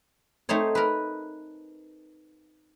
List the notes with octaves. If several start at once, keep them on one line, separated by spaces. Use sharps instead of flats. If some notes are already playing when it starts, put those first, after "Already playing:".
A3 C4 D#4 C5 C#5
A#4 B4